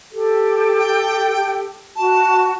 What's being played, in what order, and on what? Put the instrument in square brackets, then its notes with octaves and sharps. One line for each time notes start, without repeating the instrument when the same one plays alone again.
[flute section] G4 A4
[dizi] G5
[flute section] F#4 [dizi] A5